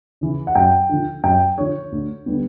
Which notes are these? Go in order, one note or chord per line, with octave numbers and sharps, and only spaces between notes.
C#3 E3
F#5
F#2 G5
D3 F3
F#2 G5
D3 F3 C#5
D2
D3 G3 B3